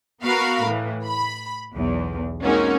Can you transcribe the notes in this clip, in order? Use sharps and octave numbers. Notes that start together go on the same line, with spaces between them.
B3 F#4 A#4 F5 B5
A2 E3
B5
B1 E2
G#3 A#3 C4 C#4 D#4 F#4